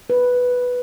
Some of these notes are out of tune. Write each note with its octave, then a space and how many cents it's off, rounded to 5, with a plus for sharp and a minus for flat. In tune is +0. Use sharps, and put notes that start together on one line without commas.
B4 +0